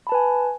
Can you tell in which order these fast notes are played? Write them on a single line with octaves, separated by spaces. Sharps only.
B5 A5 B4 G#5